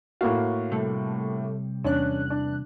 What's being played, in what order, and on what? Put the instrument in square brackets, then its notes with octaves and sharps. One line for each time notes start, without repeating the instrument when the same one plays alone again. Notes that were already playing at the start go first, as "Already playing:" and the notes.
[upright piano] A2 A#3 F#4 [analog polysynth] F5
[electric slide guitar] C3 G3 [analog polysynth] A3
[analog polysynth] E2 F#6 [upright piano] C#4 D4
[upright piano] D4